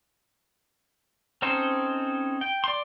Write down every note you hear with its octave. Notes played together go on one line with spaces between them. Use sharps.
C4 C#4 D#4 A4 C5
G5
D5 C6